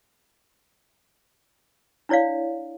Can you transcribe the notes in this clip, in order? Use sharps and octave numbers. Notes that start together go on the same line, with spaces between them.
D4 E4 C#5 D5 F5